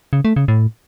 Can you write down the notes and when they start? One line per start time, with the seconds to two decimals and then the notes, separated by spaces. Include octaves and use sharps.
0.13 C#3
0.25 A3
0.36 C#3
0.48 A2